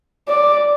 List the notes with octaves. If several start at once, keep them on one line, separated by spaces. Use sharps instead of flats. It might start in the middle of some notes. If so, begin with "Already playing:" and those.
D5